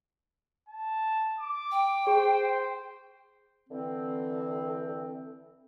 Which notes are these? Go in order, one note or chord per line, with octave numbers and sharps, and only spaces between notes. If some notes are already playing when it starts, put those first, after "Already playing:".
A5
D6
G5
G#4 C5
D3 E3 C4